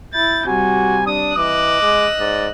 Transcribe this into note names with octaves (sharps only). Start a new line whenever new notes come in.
E4 G6 A6
C3 G3 F#4 G#5
D4 D#6
E3 D#5 D6 E6 F#6
G#3
G#2 D5